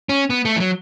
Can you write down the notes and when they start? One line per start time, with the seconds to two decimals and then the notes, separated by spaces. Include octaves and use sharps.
0.09 C#4
0.30 B3
0.45 A3
0.56 E3
0.60 F#3